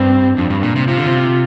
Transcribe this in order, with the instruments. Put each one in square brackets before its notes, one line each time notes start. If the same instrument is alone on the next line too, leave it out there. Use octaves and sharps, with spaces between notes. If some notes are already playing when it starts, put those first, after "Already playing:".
Already playing: [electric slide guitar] G2 [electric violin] C4
[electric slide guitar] F2 [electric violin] D4
[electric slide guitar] G2
A#2
C3
[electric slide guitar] C3 [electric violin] F4
[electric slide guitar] D3
C3